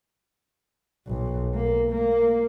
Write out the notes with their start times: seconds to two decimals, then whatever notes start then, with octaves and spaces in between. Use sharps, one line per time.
1.07 B1
1.54 A#3
1.91 A#3